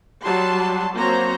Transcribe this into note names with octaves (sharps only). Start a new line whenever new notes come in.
F#3 G3 A5 C6
F#3 A#3 C4 C5 C#5 A#5